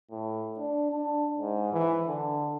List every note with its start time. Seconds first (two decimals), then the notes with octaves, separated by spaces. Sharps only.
0.11 A2
0.59 D4
0.92 D4
1.38 G#2
1.73 E3
2.07 D3